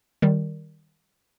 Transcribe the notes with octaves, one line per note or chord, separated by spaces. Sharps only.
D#3 G3